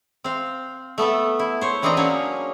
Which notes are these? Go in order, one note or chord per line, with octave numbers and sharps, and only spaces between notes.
C4 F5
A3 B3 A4 E5
E4
C5 C#5
E3 C4 D4 G#4 D#5 A#5
F#3 A#3 C#4 D4 C#5